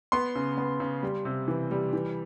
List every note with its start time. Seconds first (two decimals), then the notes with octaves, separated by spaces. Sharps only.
0.12 B3 C6
0.35 C#3
0.58 B3
0.80 C#3
1.03 G3
1.25 C3
1.48 E3
1.71 G3
1.93 E3